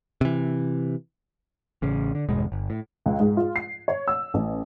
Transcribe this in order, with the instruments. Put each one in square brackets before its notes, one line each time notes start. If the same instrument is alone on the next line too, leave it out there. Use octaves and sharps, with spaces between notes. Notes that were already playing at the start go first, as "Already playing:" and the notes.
[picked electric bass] C3 E3
A1 C#3
D3
G1 E2 B2 G#3
G1
A2
[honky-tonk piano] C#2
G#2
F4
C7
C#5
E6
A1